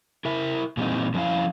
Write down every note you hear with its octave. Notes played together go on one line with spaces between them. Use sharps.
E4 A#4 E5
A#2 E3 G3 G#3 C4 D#4
D3 F3 C#4 E4 F5